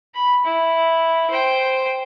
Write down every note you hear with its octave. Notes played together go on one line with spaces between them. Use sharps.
B5
E4
C5 G5